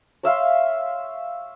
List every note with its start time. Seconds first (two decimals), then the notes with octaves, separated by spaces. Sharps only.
0.23 C#5 E5 F5 C6